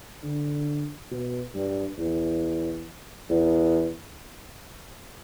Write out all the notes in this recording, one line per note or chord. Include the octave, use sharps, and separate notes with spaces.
D3
B2
G2
E2
E2